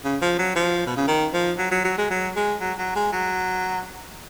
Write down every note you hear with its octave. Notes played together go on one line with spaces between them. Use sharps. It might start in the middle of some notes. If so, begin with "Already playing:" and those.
C#3
F3
F#3
F3
B2
C#3
D#3
F3
F#3
F#3
F#3
G#3
F#3
G#3
F#3
F#3
G#3
F#3